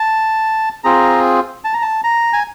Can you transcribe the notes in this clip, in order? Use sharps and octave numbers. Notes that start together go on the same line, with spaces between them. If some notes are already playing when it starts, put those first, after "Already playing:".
Already playing: A5
C4 F4 G#4 A#5
A5
A#5
A5
A#5
G#5